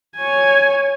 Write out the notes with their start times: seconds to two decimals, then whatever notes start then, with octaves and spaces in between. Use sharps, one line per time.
0.16 C#5 G#5